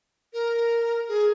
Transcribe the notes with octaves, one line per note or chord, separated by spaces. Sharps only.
A#4
G#4